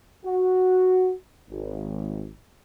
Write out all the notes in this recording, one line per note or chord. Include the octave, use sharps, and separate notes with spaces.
F#4
G#1